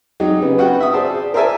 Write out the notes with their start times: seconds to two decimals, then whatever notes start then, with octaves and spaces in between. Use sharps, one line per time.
0.20 F#3 D#4 G4 G#4
0.42 C#3 B3
0.58 B3 F#4 B4 F#5 G5
0.80 E5 D#6
0.94 G#4 C5 D5 A5
1.34 A#4 C5 D5 E5 G#5 A5